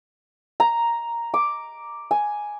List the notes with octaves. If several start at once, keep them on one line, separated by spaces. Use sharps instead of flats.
A#5
D6
G#5